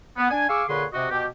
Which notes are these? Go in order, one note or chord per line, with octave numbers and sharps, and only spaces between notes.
B3
D4 G#5
G#4 F5 G#5 C#6 D6 E6
A#2 D3 G#4 B4 C#5 C6
C3 F#4 D#5
B2 G4